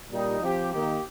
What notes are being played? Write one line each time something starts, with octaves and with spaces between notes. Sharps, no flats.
A#2 G3 D#4 G4
F3 C4 G4
D#3 A#3 D#4 G4